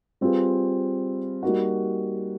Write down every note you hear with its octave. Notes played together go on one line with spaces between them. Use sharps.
G3 C4 F4 G#4 B4
G3 A#3 D#4 F#4